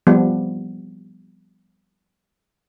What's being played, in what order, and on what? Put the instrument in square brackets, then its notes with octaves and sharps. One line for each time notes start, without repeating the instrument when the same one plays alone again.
[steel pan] F3 G3 B3